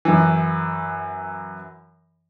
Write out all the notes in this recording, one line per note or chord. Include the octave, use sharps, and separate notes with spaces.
F#2 E3